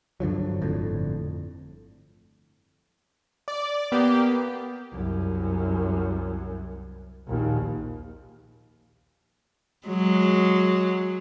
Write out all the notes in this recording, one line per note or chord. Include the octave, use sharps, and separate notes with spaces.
G2 D3 F3 F#3
G1 F2 A2 D3
D5
A#3 B3 G4
C2 F#2
A#1 D#2
F#3 G#3